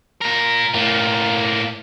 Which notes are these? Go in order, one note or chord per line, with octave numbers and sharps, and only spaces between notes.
A#2 A#4
A2 A#3